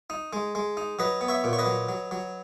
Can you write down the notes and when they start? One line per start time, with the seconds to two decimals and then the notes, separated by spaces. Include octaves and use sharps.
0.10 D#4
0.33 G#3
0.55 G#3
0.77 D#4
0.99 F#3 B4 D#5
1.21 B3
1.28 C#5 E5
1.44 A#2
1.53 C#5
1.59 B4 D#5
1.66 F#3
1.89 F#3
2.11 F#3